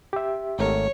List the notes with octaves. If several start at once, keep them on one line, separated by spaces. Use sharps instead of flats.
G4 E5
G#1 A3 A#4 C#5